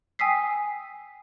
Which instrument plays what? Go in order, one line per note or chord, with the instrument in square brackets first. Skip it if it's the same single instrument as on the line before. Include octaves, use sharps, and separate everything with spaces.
[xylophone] G5 G#5 D#6 E6 B6 C7